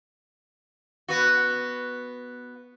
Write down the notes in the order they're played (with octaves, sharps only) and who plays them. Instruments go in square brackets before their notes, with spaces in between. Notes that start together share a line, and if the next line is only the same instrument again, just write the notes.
[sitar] B3 F#4